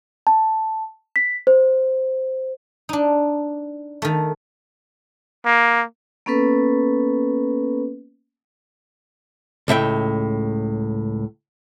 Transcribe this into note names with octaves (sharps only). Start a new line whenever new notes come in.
A5
B6
C5
D4 D#4
D#3 A3
A#3
A#3 B3 C#4 A4 B4
C#2 A2 E5 G5